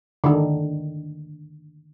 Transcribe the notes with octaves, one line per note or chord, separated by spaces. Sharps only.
D3 D#3